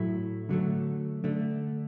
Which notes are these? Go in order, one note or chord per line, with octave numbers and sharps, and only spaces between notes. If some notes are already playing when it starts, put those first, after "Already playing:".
Already playing: A2 F#3 A3 E4
D3 F#3 A3
D3 A3